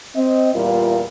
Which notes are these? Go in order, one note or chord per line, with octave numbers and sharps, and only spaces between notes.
C4 D#5
E2 A#2 G3 E4 F4 A#4